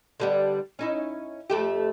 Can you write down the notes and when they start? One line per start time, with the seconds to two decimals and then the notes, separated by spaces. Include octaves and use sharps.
0.20 D3 G3 B3
0.79 C#4 D#4 E4
1.50 F2 A3 G4